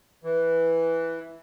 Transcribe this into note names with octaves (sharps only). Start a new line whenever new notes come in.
E3